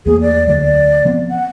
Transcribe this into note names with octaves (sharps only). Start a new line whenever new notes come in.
E2 A3 A#3 G#4
D5
D2 F#3 A3 D5
F3 B3 C4
F#5